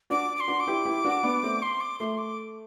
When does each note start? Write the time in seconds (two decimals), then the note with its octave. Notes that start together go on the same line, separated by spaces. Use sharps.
0.10 D4 F#4 D6
0.36 D6
0.40 C6
0.48 D4 F#4
0.60 D6
0.67 E4 G4
0.85 E4 G4
1.05 D4 F#4
1.23 B3 D4
1.43 A3 C4
1.62 C6
1.81 D6
1.99 A3 C6
2.18 D6